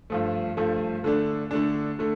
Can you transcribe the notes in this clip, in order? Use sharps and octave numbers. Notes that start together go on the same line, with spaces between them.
G2 F3 A3
G2 F3 A3
D3 A3 D4
D3 A3 D4
D3 A3